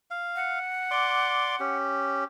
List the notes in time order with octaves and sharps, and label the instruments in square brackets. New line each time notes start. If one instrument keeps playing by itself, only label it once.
[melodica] F5
[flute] F#5
[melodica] D5 C6 D6
C#4 G4